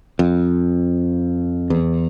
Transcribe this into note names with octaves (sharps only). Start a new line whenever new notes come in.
F2
E2